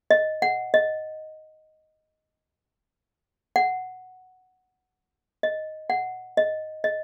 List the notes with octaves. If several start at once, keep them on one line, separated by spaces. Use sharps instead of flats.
D#5
F#5
D#5
F#5
D#5
F#5
D#5
D#5